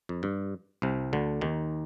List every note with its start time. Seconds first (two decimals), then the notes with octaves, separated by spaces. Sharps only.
0.09 F2
0.23 G2
0.82 C2 C3
1.13 D2 D3
1.41 D#2 D#3